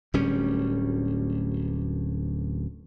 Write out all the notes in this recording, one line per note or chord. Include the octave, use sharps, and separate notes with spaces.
D1 D2 G3 C#4